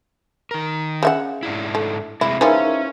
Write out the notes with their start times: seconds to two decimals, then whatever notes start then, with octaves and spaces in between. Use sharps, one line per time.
0.51 D#3 A#4
1.03 C#3 E5 F#5
1.43 G#2 D4 E4
1.75 A3
2.21 C3 G#3 A3 E4
2.41 E3 F3 G#3 C#4 D#4 A#4 E5